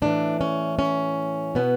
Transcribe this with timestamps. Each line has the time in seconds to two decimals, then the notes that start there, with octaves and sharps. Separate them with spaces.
0.02 A2 E3 D4
0.41 C#4
0.79 C#4
1.55 B2 B3